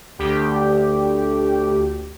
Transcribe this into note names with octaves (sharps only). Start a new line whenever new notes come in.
D2 G4